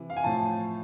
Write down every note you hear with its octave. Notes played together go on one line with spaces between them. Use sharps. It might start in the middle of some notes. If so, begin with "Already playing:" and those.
Already playing: C3 E3
F5
G#5
A2 F3 A5